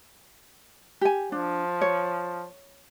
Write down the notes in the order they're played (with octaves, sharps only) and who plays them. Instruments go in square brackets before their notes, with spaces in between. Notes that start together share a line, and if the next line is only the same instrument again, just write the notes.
[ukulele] G4 G#5
[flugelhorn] F3 [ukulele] D4
[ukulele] C#5